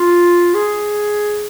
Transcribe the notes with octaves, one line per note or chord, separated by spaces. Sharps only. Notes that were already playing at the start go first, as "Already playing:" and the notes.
Already playing: F4
G#4